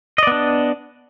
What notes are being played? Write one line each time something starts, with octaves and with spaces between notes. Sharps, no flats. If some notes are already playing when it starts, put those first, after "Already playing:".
B3 D4 D5 D#5